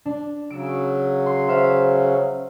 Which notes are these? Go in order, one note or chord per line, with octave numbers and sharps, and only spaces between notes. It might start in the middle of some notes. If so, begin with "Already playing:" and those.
D4
C#3 F#3 E6 D7
C6
C5 E5 F5